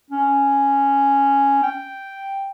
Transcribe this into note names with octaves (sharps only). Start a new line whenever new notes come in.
C#4
G5